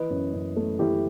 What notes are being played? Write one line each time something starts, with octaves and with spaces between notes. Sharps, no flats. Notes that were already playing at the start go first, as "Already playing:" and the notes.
Already playing: E3 B4 D#5
F#2
F#2
A3
E3 E4 G4